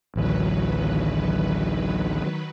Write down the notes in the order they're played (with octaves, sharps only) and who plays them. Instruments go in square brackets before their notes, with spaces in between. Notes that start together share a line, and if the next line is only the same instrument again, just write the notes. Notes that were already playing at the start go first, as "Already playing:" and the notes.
[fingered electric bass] A1 D2 [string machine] D#3 F#3 B4